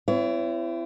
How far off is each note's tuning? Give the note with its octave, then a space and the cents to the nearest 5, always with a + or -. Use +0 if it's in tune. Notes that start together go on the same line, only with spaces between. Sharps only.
C4 -30 E4 +30 C#5 +40